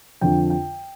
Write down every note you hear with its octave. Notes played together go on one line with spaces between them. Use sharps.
F2 D3 F3 G5
G5